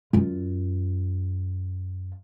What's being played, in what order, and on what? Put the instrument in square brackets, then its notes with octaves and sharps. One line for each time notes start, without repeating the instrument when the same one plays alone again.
[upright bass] F#2 F4